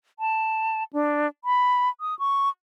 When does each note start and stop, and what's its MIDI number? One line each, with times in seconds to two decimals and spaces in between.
0.19 0.84 81
0.93 1.27 62
1.44 1.89 83
2.01 2.18 87
2.19 2.49 85